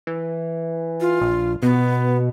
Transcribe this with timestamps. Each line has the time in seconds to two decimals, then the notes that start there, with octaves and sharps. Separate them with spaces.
0.07 E3
1.01 F4
1.21 A#1
1.63 B2 B3